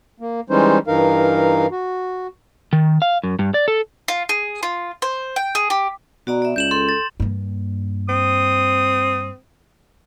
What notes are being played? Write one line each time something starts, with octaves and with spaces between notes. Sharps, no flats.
A#3
E3 G3 G#3 C#4 D#4 C5
G2 E3 D#4 A#4 F5
F#4
D#3
F5
F#2
G2
D5
A4
F4
G#4
F4
C5
G5
G#4
G4
B2 F#4 D5 A#5
D5 E5
C#2 G6 E7 F#7
A4 C6
A6
G2 A#3
C4 D#6